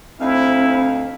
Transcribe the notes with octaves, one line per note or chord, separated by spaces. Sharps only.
D2 C4 D#4 E4 F5